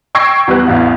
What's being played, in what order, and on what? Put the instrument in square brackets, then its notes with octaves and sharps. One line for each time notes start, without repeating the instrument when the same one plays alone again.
[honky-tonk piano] G5 C#6 E6 G#6 A#6 C7
E2 G3 B3 F#6
A1 E2 F5